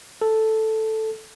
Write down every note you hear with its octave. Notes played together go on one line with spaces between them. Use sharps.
A4